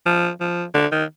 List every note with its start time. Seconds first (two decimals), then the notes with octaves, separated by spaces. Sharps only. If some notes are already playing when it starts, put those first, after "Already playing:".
0.06 F3
0.40 F3
0.74 D3
0.92 D#3